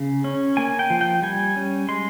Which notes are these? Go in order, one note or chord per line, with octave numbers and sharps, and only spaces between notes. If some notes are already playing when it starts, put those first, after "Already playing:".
Already playing: C#3
C#4
A#3 G#5
G5
F3
G5
G3 G#5
C#4
G#3 C6